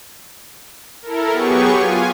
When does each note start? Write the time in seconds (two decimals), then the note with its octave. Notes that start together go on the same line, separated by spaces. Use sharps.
1.02 E4 A4 A#4
1.32 F#3 B3 G4 G#4 C#6
1.71 F4 G#5